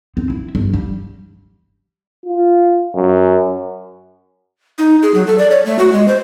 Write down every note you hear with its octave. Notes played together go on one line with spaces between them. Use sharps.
C4
E4
G1
G3
F4
F#2
D#4
G#4
F#3
A4
D5
C#5
A3
F#4
G#3
C5